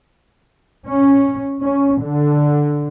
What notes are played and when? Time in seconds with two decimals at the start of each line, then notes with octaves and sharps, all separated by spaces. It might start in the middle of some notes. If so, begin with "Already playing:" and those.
0.87 C#4
1.62 C#4
2.03 D3